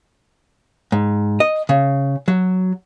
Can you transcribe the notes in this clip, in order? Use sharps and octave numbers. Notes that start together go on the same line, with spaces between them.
G#2
D#5
C#3
F#3